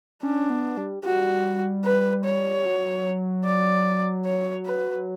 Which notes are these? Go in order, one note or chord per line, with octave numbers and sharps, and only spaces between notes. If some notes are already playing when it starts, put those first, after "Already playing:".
C#4 D4
B3
G3
G3 F#4
B4
C#5
F#3
D5
C#5
B4